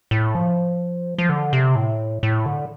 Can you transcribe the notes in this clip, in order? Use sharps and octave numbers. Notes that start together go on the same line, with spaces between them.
A2
F3
F3
D3
C3
A2
A2
D3